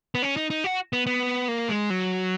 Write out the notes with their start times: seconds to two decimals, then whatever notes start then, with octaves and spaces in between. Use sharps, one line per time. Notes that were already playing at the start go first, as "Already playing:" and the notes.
0.15 B3
0.22 C#4
0.37 D#4
0.50 D#4
0.64 F#4
0.93 B3
1.07 B3
1.48 A#3
1.69 G#3
1.90 F#3